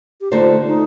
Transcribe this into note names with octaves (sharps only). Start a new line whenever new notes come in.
G4
D3 A3 D#4 F4 A4 C5
D#4